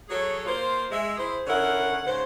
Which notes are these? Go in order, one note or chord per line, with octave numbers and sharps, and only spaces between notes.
F#3 G#4 A4 C#5
A#3 F4 C5
G#3 E5
E4 G#4 C5
D3 C#4 E4 A#4 F#5
G#2 C#3 C5